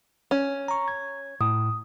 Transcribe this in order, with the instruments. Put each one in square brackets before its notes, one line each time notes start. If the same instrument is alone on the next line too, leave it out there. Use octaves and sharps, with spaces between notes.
[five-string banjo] C#4
[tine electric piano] A#5 C#6
G#6
[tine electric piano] A2 [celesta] D#6